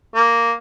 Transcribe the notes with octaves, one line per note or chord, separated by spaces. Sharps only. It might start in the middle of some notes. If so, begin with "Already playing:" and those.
A#3